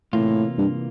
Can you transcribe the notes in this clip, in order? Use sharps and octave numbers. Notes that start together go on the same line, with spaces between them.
A2 C3 E3 A#3 F4
G2